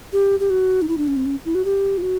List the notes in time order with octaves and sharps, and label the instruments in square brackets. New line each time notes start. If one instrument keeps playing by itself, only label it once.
[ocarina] G4
G4
F#4
D#4
E4
D4
C#4
C4
C#4
E4
F#4
G4
F4
F#4